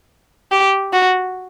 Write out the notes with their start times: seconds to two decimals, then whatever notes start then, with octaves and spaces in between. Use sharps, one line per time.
0.51 G4
0.93 F#4